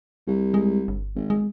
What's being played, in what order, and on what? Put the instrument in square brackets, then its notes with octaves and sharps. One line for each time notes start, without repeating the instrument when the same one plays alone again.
[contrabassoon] C2
[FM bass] G#3
G1
[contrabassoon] G#1
[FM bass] G#3